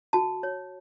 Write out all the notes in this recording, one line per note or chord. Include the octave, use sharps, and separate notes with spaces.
F#4 A5
C#5